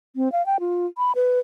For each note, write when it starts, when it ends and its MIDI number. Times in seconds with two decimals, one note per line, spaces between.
0.16 0.31 60
0.32 0.44 77
0.46 0.60 79
0.60 0.86 65
0.98 1.12 83
1.15 1.39 71